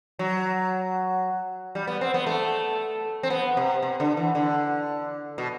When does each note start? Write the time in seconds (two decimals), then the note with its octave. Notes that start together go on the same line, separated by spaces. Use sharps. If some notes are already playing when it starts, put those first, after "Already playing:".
0.19 F#3
1.75 G3
1.87 B3
2.01 C4
2.14 B3
2.26 A3
3.23 C4
3.30 B3
3.57 C3
3.83 C3
4.00 D3
4.17 E3
4.35 D3
5.38 B2